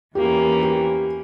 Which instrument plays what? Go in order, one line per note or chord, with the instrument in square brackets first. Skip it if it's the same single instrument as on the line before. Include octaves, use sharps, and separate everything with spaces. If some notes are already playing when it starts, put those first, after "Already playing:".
[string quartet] E2 E3 A#3 C#4 [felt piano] G4
[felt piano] G4